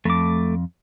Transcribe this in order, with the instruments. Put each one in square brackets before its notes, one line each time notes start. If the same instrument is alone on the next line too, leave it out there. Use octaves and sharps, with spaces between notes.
[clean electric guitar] F2 [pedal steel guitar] A3 D6